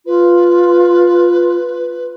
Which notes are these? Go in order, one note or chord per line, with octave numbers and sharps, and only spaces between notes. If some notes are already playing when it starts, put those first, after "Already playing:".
F4 B4